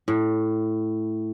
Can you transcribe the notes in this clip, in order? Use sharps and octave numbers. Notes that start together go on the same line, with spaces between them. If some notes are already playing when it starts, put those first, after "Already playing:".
A2